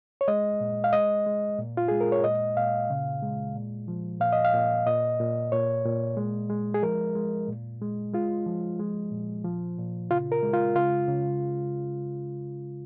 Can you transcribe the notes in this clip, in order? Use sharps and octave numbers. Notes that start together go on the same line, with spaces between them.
C#5
G#3 D#5
A#2
F5
G#3 D#5
G#3
A#2
F4
G#3 G#4
A#4
C#5
A#2 D#5
A#2 F5
C#3
G#3
A#2
F3
A#2 F5
D#5
F5
A#2
A#2 D#5
A#2
A#2 C#5
A#2
G#3
G#3
G#4
F3 A#4
G#3
A#2
G#3
G#3 F4
F3
G#3
A#2
F3
A#2
C#3 F4
A#4
G#3
F4
C#3 F4
C#3